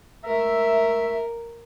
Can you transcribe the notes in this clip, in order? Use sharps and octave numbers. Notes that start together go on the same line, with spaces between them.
C#2 A3 A#4 E5